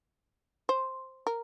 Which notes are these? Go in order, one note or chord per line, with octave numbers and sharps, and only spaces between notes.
C5
A#4